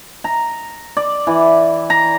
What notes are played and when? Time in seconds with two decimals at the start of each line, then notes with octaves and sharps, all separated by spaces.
0.24 A#5
0.97 D5
1.27 E3
1.90 A#5